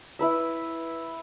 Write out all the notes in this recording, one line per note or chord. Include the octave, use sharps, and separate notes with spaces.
E4 B4 E5